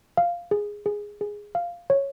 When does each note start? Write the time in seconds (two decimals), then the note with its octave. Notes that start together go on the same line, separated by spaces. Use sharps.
0.17 F5
0.51 G#4
0.86 G#4
1.21 G#4
1.55 F5
1.90 C#5